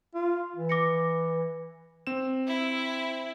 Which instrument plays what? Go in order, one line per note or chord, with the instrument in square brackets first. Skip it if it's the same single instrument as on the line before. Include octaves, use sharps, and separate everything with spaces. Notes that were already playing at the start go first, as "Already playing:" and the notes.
[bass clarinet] F4
E3
[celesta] D6 A#6 C#7
[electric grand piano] C4 E7
[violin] E4